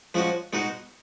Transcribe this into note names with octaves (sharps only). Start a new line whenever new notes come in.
F3 G#3 C#4 F#4
B2 G#3 D#4 F#4